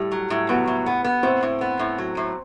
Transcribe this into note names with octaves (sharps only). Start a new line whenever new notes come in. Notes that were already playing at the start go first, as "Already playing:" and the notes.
Already playing: A2 G3
F#3
A2
F#3 B3
A2
B3
B3
A2 C4
A2
B3
A2
F#3
A2